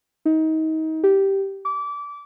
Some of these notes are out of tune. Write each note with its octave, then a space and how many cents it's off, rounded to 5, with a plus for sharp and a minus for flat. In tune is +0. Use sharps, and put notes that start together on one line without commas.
D#4 +30
G4 -5
D6 -25